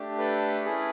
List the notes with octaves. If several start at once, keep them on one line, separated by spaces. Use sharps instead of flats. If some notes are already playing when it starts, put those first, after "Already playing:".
Already playing: A3 D4 G4
A4 B4
C#4 E4 G#4